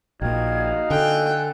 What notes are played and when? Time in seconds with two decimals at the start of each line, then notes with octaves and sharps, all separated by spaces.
0.22 A#1 A#2 D#4 F#4 F5 G5 G#6
0.90 D3 A4 G5 G#5 F#6